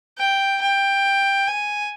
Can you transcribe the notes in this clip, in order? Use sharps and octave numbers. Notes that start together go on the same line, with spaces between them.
G5
G5
G#5